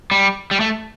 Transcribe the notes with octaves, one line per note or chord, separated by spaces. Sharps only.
G3
G3
A3